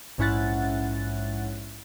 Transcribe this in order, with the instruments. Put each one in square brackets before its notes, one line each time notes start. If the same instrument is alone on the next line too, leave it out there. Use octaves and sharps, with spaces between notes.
[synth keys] A#1 G#2 C#4 E4 F#5 A6